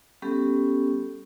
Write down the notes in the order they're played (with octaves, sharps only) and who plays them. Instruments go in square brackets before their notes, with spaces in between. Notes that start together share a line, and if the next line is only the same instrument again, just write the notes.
[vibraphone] G3 B3 C#4 G4 A4